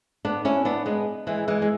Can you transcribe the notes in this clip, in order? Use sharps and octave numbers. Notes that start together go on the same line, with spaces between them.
B3 D4
C#4 E4
B3 D4
G#3 B3
E3 G#3
E3 G#3
G#3